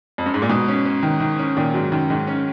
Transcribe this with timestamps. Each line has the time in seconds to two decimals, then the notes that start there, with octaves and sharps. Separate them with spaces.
0.18 F2
0.26 F#2
0.34 G#2
0.42 A#2
0.50 G#2 B2
0.68 C#4
0.85 C#4
1.03 D#3
1.20 D#3
1.39 C#4
1.57 A#2 D#3
1.74 G#2 F#3
1.92 F#2 D#3
2.10 G#2 D#3
2.27 C#4